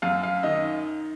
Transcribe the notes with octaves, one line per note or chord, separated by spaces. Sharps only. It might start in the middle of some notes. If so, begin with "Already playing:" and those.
F#2 F5
F5
D#3 D#5